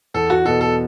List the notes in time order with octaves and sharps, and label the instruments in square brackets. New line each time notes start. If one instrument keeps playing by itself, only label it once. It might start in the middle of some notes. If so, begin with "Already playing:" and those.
[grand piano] E2 [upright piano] A4
[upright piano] F#4
[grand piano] B2 B3 [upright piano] A4
[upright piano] A4